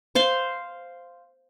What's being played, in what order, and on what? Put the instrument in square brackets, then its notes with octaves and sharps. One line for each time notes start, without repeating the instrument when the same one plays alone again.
[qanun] C5 F5 C6